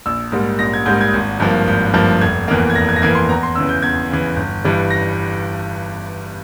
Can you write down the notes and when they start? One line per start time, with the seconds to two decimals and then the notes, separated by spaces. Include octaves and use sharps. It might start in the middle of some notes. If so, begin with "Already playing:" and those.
0.06 A#1 E6
0.32 G#2 G3 A#3
0.59 A#1 A#6
0.74 G#6
0.86 G#2 G3 A#3 G6
1.01 G#6
1.14 G#1
1.40 G2 F3 A#3
1.67 G#1 G6
1.94 G2 F3 A#3
2.21 F1 G#6
2.48 E2 E3 A#3
2.70 G#6
2.75 F1 A#6
2.89 G#6
2.96 A#6
3.02 E2 E3 A#3 G#6
3.15 C6
3.28 E2 A#5
3.43 C6
3.55 C#3 E3 E6
3.69 G6
3.82 E2 G#6
4.10 C#3 E3
4.36 G1
4.65 G2 E3 G3
4.90 A#6